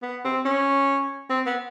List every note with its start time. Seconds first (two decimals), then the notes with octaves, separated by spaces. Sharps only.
0.02 B3
0.25 C4
0.45 C#4
1.30 C4
1.46 B3